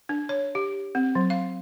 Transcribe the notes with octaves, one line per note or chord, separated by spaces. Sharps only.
D4
C#5
G4
C4
F#3
F5